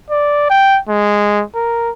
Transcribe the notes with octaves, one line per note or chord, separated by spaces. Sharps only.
D5
G5
G#3
A#4